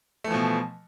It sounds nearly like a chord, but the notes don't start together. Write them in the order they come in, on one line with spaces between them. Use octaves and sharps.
A3 E3 F3 B2